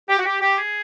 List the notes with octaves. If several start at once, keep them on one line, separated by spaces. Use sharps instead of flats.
G4
F#4
G4
G4
G#4